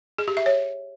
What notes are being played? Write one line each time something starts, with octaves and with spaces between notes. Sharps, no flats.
G#4
G4
E5
C#5